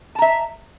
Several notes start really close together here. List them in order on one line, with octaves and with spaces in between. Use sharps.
A5 A#5 E5